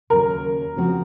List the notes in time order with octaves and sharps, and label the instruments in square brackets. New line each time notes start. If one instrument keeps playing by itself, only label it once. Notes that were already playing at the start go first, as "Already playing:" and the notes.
[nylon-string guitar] D#2 C#3 F#3 [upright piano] A#4
[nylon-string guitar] C#3 F3 C4 F#4